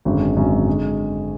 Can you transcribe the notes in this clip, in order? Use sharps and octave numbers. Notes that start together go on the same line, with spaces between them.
G#1 F#2 D3 G#3
G#1 F#2 D3 G#3
D3 G#3